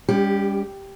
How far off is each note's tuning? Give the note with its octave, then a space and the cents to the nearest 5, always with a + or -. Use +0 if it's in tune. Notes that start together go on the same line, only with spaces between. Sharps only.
G3 +35 C#4 +40 G4 +0